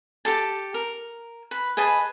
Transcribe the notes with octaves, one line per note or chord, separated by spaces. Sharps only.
G4 A4 A5
A#4
B4
G#4 B4 D#5 A5